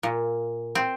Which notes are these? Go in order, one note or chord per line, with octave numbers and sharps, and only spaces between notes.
A#2
C4